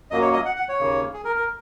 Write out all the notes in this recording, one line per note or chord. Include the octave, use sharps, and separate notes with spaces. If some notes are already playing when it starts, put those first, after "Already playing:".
F#2 F#3 A#3 D#5
C#5
D#5
F#5
F#5
C#5
D#2 C#3 A#3
G#4
A#4
A#4